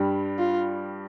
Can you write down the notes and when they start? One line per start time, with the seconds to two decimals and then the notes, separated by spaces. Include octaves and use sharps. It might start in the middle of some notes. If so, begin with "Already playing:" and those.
Already playing: G2 G3
0.39 F4